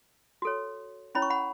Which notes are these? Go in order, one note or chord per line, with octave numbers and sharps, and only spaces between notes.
F#4 A4 C#5
C#4 E4 C#5 B5
C#6
F#5 B5